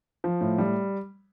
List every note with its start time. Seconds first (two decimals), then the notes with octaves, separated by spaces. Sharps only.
0.24 F3
0.41 A2
0.58 G3